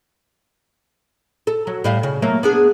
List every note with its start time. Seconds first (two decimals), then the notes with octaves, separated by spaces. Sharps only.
1.47 A4
1.67 F#3
1.84 A2 G3 F5
2.03 C#3
2.22 F#3 A3 A#3
2.43 B3 D4 G#4